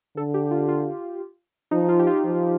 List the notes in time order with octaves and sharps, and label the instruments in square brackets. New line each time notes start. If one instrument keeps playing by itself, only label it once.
[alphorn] D3 [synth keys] A4
[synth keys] G4
F4
F4
[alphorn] F3 [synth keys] D#4
[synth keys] F4
G4
F4
[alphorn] F3